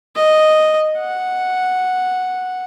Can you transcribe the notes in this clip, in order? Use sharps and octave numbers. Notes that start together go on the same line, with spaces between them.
D#5
F#5